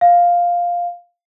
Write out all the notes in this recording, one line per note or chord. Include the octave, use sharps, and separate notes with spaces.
F5